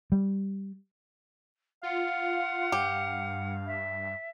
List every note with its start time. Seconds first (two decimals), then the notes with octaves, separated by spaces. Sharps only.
0.12 G3
1.83 F4 F5 F#5
2.72 G2 G4
3.67 E5